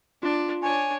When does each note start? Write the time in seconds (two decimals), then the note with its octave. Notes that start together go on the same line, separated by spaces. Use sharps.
0.23 D4 F4
0.62 D4 C#5 G#5